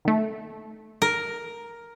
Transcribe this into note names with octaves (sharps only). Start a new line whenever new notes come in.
D#3 A3
A#4